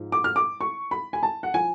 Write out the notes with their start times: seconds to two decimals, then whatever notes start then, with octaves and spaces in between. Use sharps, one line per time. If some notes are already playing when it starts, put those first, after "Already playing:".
Already playing: G#2 F3
0.12 D6
0.24 F6
0.36 D6
0.61 C#6
0.91 B5
1.13 G#5
1.23 A5
1.43 F#5
1.54 F3 G#5